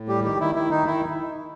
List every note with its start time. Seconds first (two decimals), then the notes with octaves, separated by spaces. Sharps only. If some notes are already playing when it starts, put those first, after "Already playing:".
Already playing: A2
0.08 G3 G4
0.24 D#3 G4
0.40 D#3 E4
0.55 D#3 E4
0.71 D#3 D#4
0.86 D#3 E4